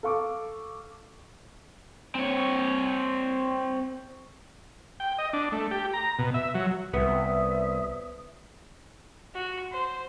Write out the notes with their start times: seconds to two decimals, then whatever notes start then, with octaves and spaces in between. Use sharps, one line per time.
0.03 A4 F5 C#6 D6
2.15 C4 C#5
5.00 G5
5.18 D#5
5.33 D4
5.52 A3
5.71 G4
5.94 A#5
6.19 B2
6.34 E5
6.54 F#3
6.93 C2 B3 E5 D#6
9.34 F#4
9.71 C5